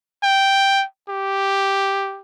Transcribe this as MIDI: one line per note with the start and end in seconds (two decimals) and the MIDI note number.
0.23 0.84 79
1.09 2.22 67